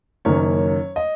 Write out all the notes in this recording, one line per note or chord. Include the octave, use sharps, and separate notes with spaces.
F#1 F#2 D#3 A#3 C#4 C#5
D#5